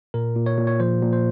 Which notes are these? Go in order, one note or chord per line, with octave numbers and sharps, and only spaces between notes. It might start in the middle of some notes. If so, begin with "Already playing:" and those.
A#2 A#4
A#2
C#5
A#2
C#5
F3 C5
A#2
C5